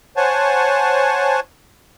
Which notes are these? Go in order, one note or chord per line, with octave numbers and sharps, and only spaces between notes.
C5 C#5 F#5 G#5 A5